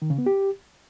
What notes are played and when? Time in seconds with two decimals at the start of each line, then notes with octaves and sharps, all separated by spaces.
0.02 D#3
0.10 C#3
0.18 B3
0.26 G4